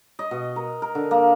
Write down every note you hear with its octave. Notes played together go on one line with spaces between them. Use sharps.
D#5
B2
A#4
A#4
D3
A#3